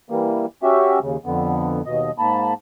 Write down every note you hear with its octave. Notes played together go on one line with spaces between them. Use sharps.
E3 G3 A#3
C#4 F#4 G4 E5
D#2 C#3
F2 D3 B3
D#2 B2 D#5
G#2 A#3 A5 B5